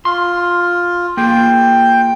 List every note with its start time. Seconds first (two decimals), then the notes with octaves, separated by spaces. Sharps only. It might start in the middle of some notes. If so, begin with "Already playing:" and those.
0.05 F4 C6
1.17 A#3 F4 G#4 G5